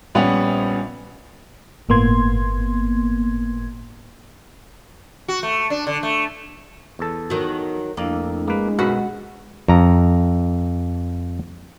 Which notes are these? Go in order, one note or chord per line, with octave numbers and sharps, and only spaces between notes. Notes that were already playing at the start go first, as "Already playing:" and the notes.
A#1 G3 B3 C#4 F#5 F7
G1 A2 A#3 B3 C6 G#6
F#4
A3
D4
D3
A3
E2 A4
D#3 F#3
F2 A3 A#3 D4 E4
G#3 A#3 B4
B1 F#2 C#4 F#4 B4
F2 A#5